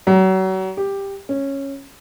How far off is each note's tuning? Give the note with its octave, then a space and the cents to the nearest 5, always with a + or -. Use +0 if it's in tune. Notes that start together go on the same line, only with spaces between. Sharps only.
F#3 +35
G4 +10
C#4 -10